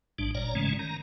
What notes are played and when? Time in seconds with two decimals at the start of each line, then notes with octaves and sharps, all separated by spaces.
0.18 A1 G#2 G3 D4
0.35 G1 A#2 C#5 D5 A#5
0.55 G#2 C#3 E3 G#3 A3 C#4
0.79 D#3 A#5